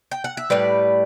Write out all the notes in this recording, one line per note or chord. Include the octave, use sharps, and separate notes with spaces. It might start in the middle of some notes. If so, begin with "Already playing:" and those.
G5
F#5
E5
A2 G3 D4 B4 D5